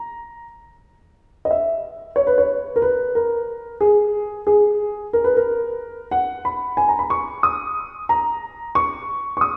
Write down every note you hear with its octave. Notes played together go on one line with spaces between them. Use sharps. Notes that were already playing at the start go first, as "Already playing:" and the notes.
Already playing: A#5
D#5
E5
C#5
B4
C#5
A#4
B4
A#4
G#4
G#4
A#4
B4
A#4
F#5
B5
G#5
A#5
B5
C#6
D#6
A#5
C#6
C#6
D#6